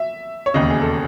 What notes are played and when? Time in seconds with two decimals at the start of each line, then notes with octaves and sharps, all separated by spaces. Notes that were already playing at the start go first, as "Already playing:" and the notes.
Already playing: E5
0.46 C#5
0.54 E1 D#2 C#3 D#5
0.70 G#4
0.81 A4